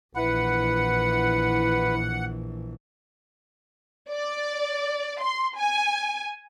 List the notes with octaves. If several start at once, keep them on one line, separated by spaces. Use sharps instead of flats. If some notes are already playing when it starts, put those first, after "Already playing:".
A#1 E3 E4 B4 F#5
D5
C6
G#5